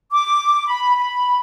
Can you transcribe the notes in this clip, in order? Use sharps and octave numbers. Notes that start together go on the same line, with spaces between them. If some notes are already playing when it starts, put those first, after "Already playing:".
D6
B5
B5